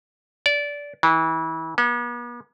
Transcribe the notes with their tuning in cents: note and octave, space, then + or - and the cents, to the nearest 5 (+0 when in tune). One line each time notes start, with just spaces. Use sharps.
D5 -20
E3 -30
B3 -45